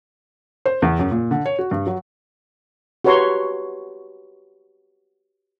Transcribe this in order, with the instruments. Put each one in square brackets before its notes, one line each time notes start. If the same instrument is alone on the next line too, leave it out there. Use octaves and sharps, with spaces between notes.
[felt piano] C5
E2
F#2
A#2
D3
C#5
F#4
G2
F#3
[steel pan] F#4 G4 B4 C#5 A#5 C6